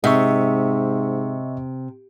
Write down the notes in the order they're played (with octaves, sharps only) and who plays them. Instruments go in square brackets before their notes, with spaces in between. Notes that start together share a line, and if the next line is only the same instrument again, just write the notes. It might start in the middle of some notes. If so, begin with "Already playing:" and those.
[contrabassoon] G#2 [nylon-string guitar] C3 [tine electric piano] D#5 E5 C#6